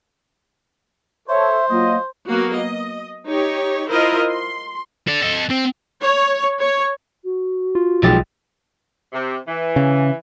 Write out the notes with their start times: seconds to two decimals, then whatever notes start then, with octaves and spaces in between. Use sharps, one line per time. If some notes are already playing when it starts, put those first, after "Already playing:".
1.29 A4 C5 C#5 E5
1.70 F#3 A#3 F4 D#5
2.28 F#3 A#3 B3 F#4
2.58 D#5
3.27 D#4 G4 C#5
3.90 E4 F4 A#4 C5 D#5
4.30 C6
5.08 A4 D5
5.22 A4 D#5
5.50 C4
6.02 C#5
6.60 C#5
7.23 F#4
7.75 F4
8.03 B1 F3 G#3 G4 A6
9.13 C3
9.47 E3
9.76 C#3